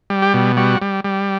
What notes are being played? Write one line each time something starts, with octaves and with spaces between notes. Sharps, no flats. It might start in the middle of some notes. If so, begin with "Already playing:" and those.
G3
G4
B2
G3 F#4
G3
G3